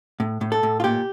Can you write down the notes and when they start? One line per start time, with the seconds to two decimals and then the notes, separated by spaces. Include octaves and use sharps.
0.20 A2
0.41 A2
0.52 A4
0.63 A2
0.80 F4
0.84 A#2 G4